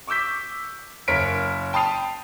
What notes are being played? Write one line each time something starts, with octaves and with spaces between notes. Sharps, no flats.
C#6 D6 E6 G6 B6
F#1 A#4 C#5 B6 D7
G5 A5 B5 D#6 C7 F7